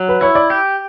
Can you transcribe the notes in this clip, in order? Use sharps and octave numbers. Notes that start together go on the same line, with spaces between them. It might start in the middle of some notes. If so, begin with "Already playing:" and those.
Already playing: F#3
B4
E4 C#5
D5
G4